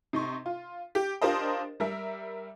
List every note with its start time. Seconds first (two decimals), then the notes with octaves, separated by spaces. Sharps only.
0.13 C3 D#4 C6 C#6
0.46 F4
0.95 G4
1.22 D4 F4 G4 A#4 C5 D#5
1.80 G3 A#4 E5